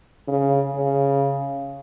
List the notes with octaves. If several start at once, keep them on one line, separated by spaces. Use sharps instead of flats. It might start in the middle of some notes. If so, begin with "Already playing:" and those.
C#3
C#3